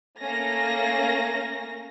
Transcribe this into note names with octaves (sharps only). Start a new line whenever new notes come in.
A3 A#3 C#4 A#6